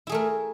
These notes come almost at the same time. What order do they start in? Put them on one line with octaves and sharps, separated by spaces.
E4 G#4 A3 A#4